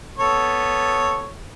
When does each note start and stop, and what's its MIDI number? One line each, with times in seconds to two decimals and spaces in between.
0.19 1.30 59
0.19 1.30 69
0.19 1.30 73